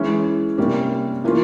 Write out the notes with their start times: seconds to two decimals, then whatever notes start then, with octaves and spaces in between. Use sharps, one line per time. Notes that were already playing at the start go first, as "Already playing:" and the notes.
Already playing: E3 G#3 C#4 E4
0.58 C3 G3 A#3 C#4
1.24 E3 A#3 C#4 F4